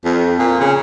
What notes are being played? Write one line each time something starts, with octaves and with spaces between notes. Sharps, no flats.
F2
A#2
C#3